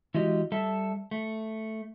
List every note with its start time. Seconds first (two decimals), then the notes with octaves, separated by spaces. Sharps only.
0.14 E3 G#3 F#4 G4 D#5
0.52 G3 A4 E5 A5
1.11 A3